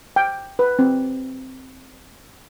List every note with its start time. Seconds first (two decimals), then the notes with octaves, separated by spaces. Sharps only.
0.16 G5
0.59 B4
0.79 C4